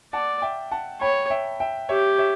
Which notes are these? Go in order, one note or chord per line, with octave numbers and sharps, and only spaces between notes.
D5 F#5 A5
E5 G5
F#5 A5
C#5 G5 B5
E5 G5
E5 G5
G4 C#5 E5
C#5 E5